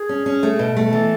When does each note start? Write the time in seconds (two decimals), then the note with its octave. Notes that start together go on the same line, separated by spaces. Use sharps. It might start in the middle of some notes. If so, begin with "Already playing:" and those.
Already playing: G#4
0.09 C#4
0.26 C#4
0.43 A3
0.59 B2
0.77 A3
0.93 E3 A4